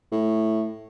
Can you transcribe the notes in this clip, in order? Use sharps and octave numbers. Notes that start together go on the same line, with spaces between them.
A2